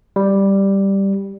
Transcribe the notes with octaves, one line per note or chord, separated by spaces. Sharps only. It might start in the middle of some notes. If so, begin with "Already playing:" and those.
G3